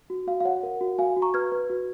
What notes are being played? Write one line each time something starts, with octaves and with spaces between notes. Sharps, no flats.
F#4
F#4 F5
F5
C#5 F#5
A#4
F#4
F#4 F5 G#5
F#4
A#5 C#6
B4 F6 G#6
B4
F#4